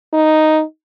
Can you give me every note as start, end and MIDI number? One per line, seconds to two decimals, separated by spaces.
0.14 0.62 63